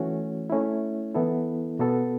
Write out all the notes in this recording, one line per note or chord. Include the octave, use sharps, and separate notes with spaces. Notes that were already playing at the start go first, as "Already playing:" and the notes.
Already playing: E3 A3 C#4 F#4
A3 C#4 E4
E3 B3 E4 A4
B2 B3 F#4 A4